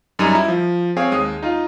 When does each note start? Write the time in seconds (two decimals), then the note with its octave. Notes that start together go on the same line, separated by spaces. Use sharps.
0.19 F#2 G3 D#4 A#5 D#7
0.35 E4
0.48 F3
0.97 C4 G#4 C#5 F5
1.12 D#2 G#3 D#6
1.43 D#4 F4